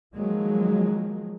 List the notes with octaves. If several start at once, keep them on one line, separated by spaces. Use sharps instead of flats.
D#3 F3 F#3 G#3 A#3